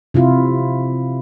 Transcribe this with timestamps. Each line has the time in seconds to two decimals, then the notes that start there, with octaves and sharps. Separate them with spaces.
0.14 C3 E4 F4